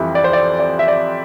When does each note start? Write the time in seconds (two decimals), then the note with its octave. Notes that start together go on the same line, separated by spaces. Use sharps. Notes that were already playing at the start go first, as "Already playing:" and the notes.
Already playing: F2 E3 G3 E4
0.15 D5
0.24 C5
0.33 D5
0.59 D5
0.79 E5
0.88 D5